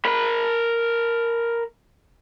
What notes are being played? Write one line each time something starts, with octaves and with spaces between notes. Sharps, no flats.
A#4 B5